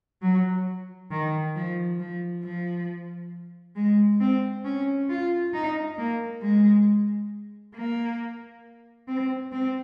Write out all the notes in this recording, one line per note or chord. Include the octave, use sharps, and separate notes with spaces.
F#3
D#3
F3
F3
F3
G#3
C4
C#4
F4
D#4
A#3
G#3
A#3
C4
C4